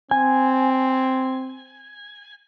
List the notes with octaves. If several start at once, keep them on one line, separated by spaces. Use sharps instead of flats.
C4 G#5